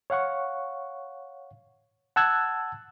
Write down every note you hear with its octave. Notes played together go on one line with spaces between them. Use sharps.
C#5 F5 F#5 C#6
F#5 A5 E6 F#6 G#6